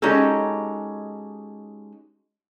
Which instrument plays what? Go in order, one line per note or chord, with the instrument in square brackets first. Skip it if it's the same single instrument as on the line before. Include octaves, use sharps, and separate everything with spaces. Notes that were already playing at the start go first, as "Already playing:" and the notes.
[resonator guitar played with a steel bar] G#3 C#4 D#4 F#4 G4 A4